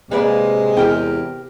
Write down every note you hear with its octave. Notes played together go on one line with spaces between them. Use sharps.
C3 G#3 A#3 B4 D5
E2 G4 A#4 G5